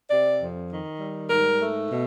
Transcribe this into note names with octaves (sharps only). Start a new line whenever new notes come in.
C3 D5
F2
D#3
G3
G#2 A#4
A3
B2